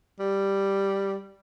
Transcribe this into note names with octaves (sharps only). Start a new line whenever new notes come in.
G3